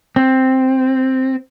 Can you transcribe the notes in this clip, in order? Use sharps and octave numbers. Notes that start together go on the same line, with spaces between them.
C4